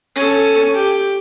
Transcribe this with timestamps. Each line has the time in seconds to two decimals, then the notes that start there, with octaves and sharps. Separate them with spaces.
0.16 C#4 A4
0.75 G4